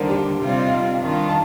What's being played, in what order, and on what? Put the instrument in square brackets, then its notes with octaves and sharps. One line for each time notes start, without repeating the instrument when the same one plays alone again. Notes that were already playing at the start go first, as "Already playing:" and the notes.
Already playing: [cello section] D#2 D3 G3 [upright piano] A#4 C5
[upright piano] G4
[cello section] C3 G3 C4 F4 [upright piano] G4
[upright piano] D5
D#5
F5
[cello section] G2 D#3 G3 D4 F4
[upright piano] A5